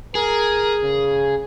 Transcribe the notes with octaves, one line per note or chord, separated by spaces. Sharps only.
G#4 A#4
C#3